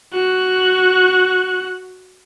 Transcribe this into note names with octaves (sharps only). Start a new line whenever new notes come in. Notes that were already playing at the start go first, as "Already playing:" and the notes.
F#4 F#6